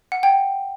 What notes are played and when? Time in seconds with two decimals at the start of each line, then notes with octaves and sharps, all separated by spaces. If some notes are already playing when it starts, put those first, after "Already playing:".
0.12 F#5
0.23 G5